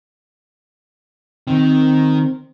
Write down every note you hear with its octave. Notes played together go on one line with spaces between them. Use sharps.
D#3 C4